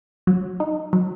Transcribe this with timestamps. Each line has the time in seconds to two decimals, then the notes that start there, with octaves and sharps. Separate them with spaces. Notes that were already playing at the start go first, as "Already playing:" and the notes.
0.27 F#3
0.60 D#4
0.93 F#3